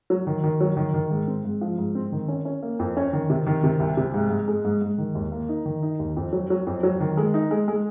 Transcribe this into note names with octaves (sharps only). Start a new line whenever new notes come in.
F#3
D#3
D#3
F#3
D#3
D#3
G#2
C4
G#2
F3
G#2
C4
D#3
C#4
C#4
A#3
F2
C#4
D#3
C3
D#3
C3
C2
C3
G#2
G#2
G#3
G#2
G#2
D#3
D#2
A#3
D#4
D#3
D#4
D#2
F2
F#3
F#3
F2
F#3
D#3
G#3
D#4
G#3
G#3